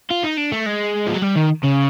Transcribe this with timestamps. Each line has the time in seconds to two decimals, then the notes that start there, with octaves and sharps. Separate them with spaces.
0.11 F4
0.24 D#4
0.37 D4
0.52 A3
0.66 G#3
1.07 F3
1.14 F#3
1.22 G3
1.36 D#3
1.63 C#3